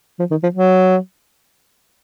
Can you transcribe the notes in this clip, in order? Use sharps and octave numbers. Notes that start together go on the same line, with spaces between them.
F3
D#3
F3
F#3